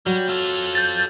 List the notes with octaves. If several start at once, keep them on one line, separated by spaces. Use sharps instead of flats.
F#3 G3
F4 A4
G6 A6